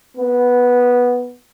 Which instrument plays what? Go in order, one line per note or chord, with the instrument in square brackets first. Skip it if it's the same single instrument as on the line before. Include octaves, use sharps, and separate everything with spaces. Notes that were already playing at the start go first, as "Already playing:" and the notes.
[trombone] B3